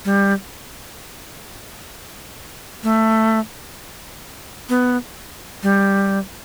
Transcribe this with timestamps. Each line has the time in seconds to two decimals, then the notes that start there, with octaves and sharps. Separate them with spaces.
0.05 G3
2.83 A3
4.69 B3
5.63 G3